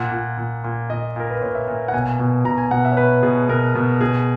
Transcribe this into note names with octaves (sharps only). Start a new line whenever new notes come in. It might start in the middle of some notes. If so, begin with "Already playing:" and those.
Already playing: A#2 F#5
A#2
A#2
A#2
A#2 D#5
A#2 A#4
B4
A#2 C#5
E5
A#2
F#5
B2 G#5
B2
B2 A#5
G#5
B2 F#5
E5
C#5
B2 B4
B2 G#4
B2 A#4
B2
B2 G#4